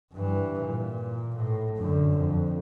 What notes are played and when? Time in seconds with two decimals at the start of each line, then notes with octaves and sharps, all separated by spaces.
0.13 G2 E3
0.60 A#2
1.36 A2
1.76 F#2 D3
2.18 F2